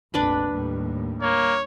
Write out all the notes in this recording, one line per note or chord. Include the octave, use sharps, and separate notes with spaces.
F1 A#1 F2 D4 B4 B5
D#2 A2 G3
A#3 C#5